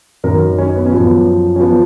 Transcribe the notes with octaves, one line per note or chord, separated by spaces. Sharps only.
F#2 D#3 F#3 A#4
C#4
B3
C#4
F#2 F3 B3
C#4
F3 B3